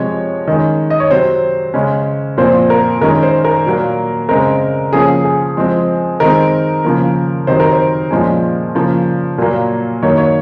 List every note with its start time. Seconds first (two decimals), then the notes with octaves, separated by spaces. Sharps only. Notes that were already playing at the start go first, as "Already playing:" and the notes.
Already playing: C3 F3 G#3 C#5
0.47 D#3 G#3 C#4
0.90 D#5
1.00 C#5
1.10 C3 F#3 C4 C5
1.74 C#3 G#3 C#4
2.38 A#2 F3 C4 C5
2.70 A#4
3.01 D#3 G#3 C#4 A#4
3.23 C5
3.45 A#4
3.66 A#2 F#3 A#3
4.29 C#3 G#3 C4 A#4
4.92 C#3 F3 A#3 C#4 G#4
5.24 G#4
5.57 F3 G#3 C4
6.20 D#3 G#3 C4 A#4
6.84 C#3 F3 A#3
7.47 C3 D#3 F#3 C5
7.60 A#4
7.72 C5
8.11 A#2 F3 G#3 C#4
8.75 C#3 F3 A#3
9.38 A#2 F#3 A#3
10.02 D#3 F#3 A#3 C#5
10.18 C#5